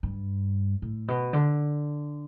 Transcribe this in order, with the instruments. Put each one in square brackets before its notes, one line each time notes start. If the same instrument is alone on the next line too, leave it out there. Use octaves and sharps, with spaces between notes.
[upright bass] G2
A2
B2
D3